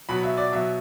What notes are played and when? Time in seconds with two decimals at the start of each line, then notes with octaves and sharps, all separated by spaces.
0.09 B2 F#3 B5
0.23 E5
0.37 D5
0.52 B2 F#3 E5